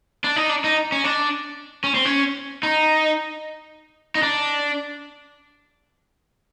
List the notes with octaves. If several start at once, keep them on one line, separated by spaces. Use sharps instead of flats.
D4
D#4
D4
D#4
C#4
D4
C#4
C4
C#4
D#4
D#4
D4